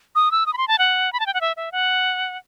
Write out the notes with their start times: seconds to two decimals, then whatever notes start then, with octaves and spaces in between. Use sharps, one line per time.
0.15 D#6
0.31 E6
0.46 D#6
0.53 B5
0.58 C6
0.68 A5
0.78 F#5
1.13 B5
1.20 A5
1.26 G5
1.34 F#5
1.41 E5
1.57 E5
1.72 F#5